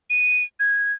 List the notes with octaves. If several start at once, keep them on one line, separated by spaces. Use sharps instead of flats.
D#7
G#6